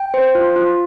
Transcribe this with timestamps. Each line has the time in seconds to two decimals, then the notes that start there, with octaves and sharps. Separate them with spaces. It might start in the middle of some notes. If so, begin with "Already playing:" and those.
Already playing: G5
0.14 C5
0.35 F4
0.56 F4